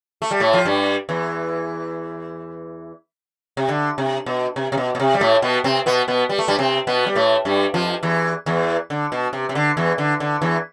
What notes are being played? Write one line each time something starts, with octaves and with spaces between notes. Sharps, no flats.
A3
G3
A2 A3
F3
G2 G3
E2 E3
C3
D3
C3
B2
C3
C3
B2
B2
C3
G3
A2 A3
B2 B3
C3 C4
B2 B3
B2 B3
G3
A3
G2 G3
C3 C4
B2 B3
G3
A2 A3
G2 G3
F2 F3
E2 E3
E2 E3
D3
B2
C3
C3
D3
E2 E3
D3
D3
E2 E3